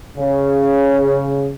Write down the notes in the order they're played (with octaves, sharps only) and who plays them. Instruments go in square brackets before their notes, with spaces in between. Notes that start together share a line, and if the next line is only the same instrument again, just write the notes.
[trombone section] C#3